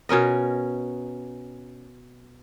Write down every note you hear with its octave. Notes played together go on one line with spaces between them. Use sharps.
B2 C#4 A#4 D#5